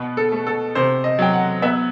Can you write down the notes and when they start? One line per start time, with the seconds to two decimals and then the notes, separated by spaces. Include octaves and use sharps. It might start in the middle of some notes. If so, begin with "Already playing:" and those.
Already playing: B2 B3
0.17 A4
0.32 A3
0.47 A4
0.75 C3 C5
1.04 D#5
1.19 F#3 G5
1.34 F#5
1.62 B3 E5